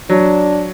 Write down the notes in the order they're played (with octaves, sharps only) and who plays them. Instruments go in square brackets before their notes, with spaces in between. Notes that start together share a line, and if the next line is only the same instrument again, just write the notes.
[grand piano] F#3 [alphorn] D4